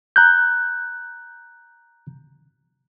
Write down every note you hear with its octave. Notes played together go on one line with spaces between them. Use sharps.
A#5 F#6 G6